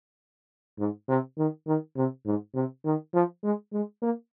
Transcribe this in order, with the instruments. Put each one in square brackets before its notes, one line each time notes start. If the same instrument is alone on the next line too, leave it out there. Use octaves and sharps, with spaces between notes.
[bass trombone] G#2
C3
D#3
D#3
C3
G#2
C3
D#3
F3
G#3
G#3
A#3